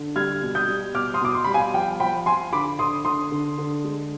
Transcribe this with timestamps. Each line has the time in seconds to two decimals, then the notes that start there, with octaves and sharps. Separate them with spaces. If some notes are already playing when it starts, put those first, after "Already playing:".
Already playing: D3
0.16 G3 F6 G#6
0.42 B2
0.55 D#6 G6
0.68 G3
0.95 B2 D6 F6
1.14 C6 D#6
1.21 B2 D6
1.35 C6
1.44 G3 B5
1.54 F5 G#5
1.74 F3 G5
2.00 F3 G5 B5
2.26 F3 G#5 C6
2.53 D3 B5 D6
2.79 D3 C6 D#6
3.05 D3 C6 D#6
3.31 D3
3.58 D3
3.84 G#3